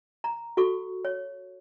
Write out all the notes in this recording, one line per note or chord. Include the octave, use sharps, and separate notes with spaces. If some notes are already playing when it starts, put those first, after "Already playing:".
A#5
F#4 A4 C#6
C#5